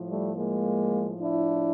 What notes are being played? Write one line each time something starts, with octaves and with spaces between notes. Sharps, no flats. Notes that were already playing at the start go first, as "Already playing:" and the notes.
Already playing: A2 F3
G3 A3
G#3 A#3
D4 E4